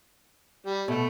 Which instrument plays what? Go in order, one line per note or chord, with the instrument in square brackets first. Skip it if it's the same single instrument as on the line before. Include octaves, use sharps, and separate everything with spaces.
[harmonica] G3
[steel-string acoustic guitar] B2 [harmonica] A3